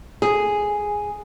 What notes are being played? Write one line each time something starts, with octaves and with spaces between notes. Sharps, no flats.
G#4